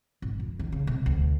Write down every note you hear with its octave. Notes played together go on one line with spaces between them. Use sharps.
G#1
F2
D#3
C#3
C3
D2